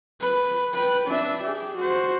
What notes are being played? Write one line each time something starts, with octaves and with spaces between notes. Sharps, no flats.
B4
B4 G5
D4 E5
G4 G#4
F#4 C5